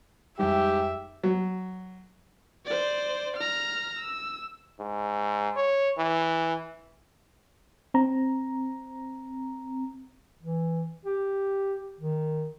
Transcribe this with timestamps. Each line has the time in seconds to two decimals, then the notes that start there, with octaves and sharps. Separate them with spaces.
0.39 F2 G#2 G3 G4 E5
1.24 F#3
2.66 C5 D5
3.37 A#5 F6
3.99 E6
4.79 G#2
5.56 C#5
5.98 E3
7.94 C4 A#5
10.43 E3
11.05 G4
12.00 D#3